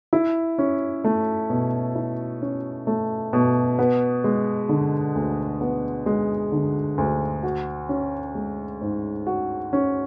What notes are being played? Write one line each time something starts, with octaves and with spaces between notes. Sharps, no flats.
E4
C#4
A3
B2
E4
C#4
A3
B2
B3
G#3
D3
D2
B3
G#3
D3
D2
F#4
C#4
G#3
G#2
F#4
C#4